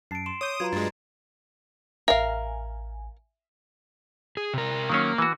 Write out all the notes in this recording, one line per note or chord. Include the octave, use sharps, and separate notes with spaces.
F#2 A5 C7 D7
C6 E7
C#5 D6 D#6 G6
F#3 F4 B4 A#5 G#6
G2 G#3 A6
A1 A#4 E5 F5 G#5
G#4
C3 A#4
D#3 F#3 A#3 C#4
E3 F#4